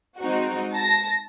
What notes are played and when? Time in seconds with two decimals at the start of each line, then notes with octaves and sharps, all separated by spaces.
0.20 G#3 C4 D#4 F#4
0.74 A5 A#6